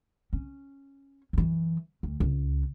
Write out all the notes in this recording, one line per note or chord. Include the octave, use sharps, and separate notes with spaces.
C#4
F#2 E3
D2
C#2